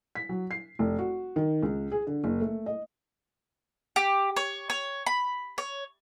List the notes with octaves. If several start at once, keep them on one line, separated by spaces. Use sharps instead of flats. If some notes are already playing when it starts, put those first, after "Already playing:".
B6
F#3
C7
F1
F#4
D#3
C#2
G#4
D3
F#1
A3
D#5
G4
C#5
C#5
B5
C#5